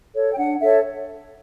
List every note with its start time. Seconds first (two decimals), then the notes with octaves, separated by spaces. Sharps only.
0.15 A4 C#5
0.33 G5
0.38 D4 F#5
0.60 A4 C#5 E5